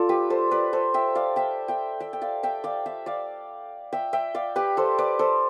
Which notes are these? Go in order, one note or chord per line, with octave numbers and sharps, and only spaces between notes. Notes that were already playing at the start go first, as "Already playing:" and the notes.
Already playing: F4 A4 D5
G4 B4
A4 C5
B4 D5
A4 C5
E5 G5
D5 F5
E5 G5
E5 G5
E5 G5
G5
D5 F5
E5 G5
D5 F5
E5 G5
D5 F5
E5 G5
E5 G5
D5 F5
G4 B4
A4 C5
B4 D5
A4 C5